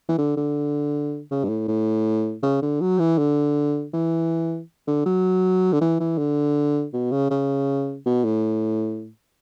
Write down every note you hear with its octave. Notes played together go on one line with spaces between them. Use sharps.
E3
D3
D3
C#3
G2
A2
A2
C#3
D3
F#3
E3
D3
E3
D3
F#3
D3
E3
E3
D3
B2
C#3
C#3
B2
A2